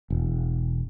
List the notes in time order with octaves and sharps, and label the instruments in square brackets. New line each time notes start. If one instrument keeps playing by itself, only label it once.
[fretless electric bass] E1